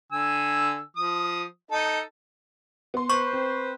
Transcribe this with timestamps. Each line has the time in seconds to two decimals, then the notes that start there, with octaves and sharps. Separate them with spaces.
0.12 D3 G#5 E6
0.96 F3 D#6
1.71 D#4 A4 D#5
2.94 B3 C6
3.10 B4 C5 C#6
3.33 C4